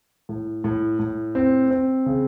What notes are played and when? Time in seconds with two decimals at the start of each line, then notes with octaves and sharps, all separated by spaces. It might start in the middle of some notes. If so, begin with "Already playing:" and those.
0.29 A2
0.64 A2
0.99 A2
1.35 C4
1.71 C4
2.06 C#3